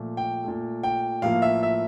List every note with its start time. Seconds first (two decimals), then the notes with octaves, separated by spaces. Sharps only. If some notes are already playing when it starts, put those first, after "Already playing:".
Already playing: A#2 F3 A3
0.17 G5
0.44 A#2 A3
0.83 G5
1.22 A2 F3 A#3 F5
1.42 E5
1.63 E5